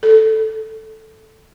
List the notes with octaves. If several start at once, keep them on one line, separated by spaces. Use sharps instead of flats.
A4